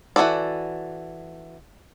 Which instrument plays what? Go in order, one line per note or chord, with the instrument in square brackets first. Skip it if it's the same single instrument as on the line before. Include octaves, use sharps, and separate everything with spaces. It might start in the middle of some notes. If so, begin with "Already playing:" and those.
[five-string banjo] E3 A#3 F#4 A4 D5